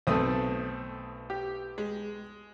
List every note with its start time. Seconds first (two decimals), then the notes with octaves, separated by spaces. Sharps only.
0.07 B1 A3 C4 A4 D#6
1.30 G4
1.78 G#3